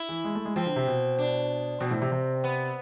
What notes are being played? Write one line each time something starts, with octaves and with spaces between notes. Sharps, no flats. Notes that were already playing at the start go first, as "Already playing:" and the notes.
Already playing: E4
E3
G#3
A3
G#3
F3 C4
D3
C3
B2
D4
B2 C4
A2
C3
C3
B3